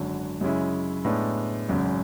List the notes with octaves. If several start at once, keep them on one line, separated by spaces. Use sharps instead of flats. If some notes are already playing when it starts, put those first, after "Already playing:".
Already playing: G#1 F#2 D3 F#3
F#2 C#3 G#3 C#4 E4
A2 G#3 B3 D4
G#1 F#2 C#3